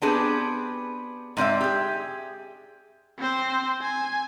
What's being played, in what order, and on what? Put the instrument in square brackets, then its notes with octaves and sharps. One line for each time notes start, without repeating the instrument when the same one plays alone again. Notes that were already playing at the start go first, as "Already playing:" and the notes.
[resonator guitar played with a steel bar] B3 C4 D4 G4 G#4 B4
G#2 C4 D5 E5
G4 G#4
[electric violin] C4 C5
G#5